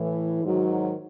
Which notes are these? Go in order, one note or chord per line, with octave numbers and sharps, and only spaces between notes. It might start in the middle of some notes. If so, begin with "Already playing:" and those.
Already playing: A2 E3
G#2 D#3 F#3